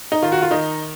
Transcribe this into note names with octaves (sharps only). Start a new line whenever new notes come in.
D#4
D#3 F4
F#4
F4
D#3 D#4